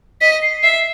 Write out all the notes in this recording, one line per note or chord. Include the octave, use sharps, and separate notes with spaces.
D#5 B6
C7
E5 C7